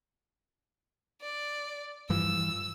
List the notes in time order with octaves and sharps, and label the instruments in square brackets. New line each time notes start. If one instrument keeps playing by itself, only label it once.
[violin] D5
[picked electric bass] G2 E3 F3 [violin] E6